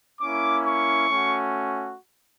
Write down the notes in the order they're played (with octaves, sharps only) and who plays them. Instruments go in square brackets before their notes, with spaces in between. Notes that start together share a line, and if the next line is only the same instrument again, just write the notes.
[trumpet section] A#3 C#4 E4 D6
C#6
A3 C#4 F#4